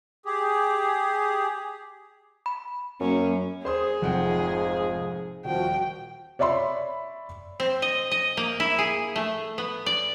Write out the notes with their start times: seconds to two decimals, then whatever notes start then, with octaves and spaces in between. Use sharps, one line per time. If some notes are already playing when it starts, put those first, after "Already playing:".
0.26 G4 G#4
2.46 B5
3.00 F#2 F#3 A#3 C#4
3.65 G#4 C5 C6 D#6
4.02 F1 G#2 F3 F#5 G5
5.45 D#1 F3 F#4 G5
6.39 C#5 D5 E5 B5 C6
7.60 C4
7.82 D#5
8.11 D#5
8.37 A#3
8.60 E4
8.79 G#4
9.16 A3
9.58 B3
9.86 D5